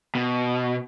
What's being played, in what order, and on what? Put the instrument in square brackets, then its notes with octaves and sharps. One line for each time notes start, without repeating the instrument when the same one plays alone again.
[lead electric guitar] B2